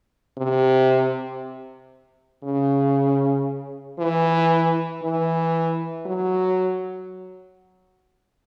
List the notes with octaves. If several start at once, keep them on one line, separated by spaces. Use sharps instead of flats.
C3
C#3
E3
E3
F#3